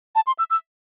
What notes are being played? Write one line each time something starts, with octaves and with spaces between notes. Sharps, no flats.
A5
C6
E6
E6